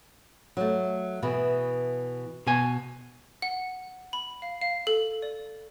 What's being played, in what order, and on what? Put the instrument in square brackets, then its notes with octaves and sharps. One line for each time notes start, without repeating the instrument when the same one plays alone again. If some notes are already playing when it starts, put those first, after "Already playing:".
[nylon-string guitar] F#3 A3
B2 E3 G#4
[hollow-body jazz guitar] B2 G#5
[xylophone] F#5
B5
F5
F5
A4
D5